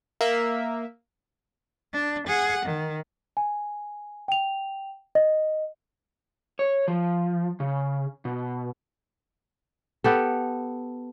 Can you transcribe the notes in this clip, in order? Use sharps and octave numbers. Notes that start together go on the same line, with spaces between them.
A#3 E5
D4
G#4 F#5
D#3
G#5
G5 F7
D#5
C#5
F3
C#3
B2
B3 G4 A4